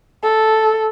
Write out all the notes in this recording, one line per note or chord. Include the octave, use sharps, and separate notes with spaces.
A4